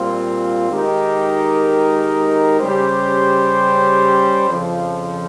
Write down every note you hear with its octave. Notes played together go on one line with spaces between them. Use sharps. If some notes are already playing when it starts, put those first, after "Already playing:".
Already playing: A#2 G3 C4 F4
D#3 G#3 D#4 G4 A#4
C#3 G3 C#4 G4 C5
F2 C#3 F3